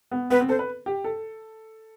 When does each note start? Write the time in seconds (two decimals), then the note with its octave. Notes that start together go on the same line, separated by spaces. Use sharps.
0.11 B3
0.30 B3 B4
0.40 C4
0.49 A4 C5
0.59 B4
0.86 G4
1.04 A4